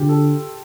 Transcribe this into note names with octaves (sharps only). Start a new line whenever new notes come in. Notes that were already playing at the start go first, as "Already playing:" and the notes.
Already playing: D3 F4 G4
A4